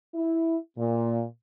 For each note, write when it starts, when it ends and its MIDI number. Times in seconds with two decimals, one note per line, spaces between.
0.14 0.57 64
0.79 1.24 46